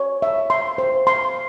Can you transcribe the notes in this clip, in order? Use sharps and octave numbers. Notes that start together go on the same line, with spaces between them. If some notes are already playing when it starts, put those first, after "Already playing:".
Already playing: C#5
E5
C6
C5
C6